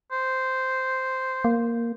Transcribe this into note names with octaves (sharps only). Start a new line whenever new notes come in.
C5
A#3